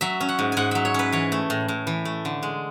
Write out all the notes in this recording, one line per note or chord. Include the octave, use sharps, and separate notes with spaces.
F#3 E5
C#4
F#5
G#2
G#2 F#5 G#5
F#3 E5
C#5
C#4 B4
E3 C#5
A3
A2
A2
E3
A3
D3
G#3